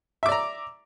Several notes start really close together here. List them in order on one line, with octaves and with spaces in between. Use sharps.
E5 D6 D5 A#5